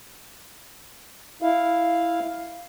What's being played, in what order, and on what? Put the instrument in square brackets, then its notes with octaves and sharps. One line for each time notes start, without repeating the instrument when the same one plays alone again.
[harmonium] E4 F5